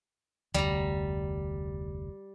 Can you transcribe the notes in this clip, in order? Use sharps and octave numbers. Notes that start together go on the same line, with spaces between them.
F1 D2 G3 A#5